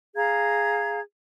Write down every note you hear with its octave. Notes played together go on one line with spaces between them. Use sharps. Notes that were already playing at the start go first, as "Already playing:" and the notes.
G#4 F5 A#5 G#6